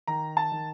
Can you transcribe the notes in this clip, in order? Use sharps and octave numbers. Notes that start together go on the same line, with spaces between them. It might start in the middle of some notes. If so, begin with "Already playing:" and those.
D#3 A#5
A5
D#3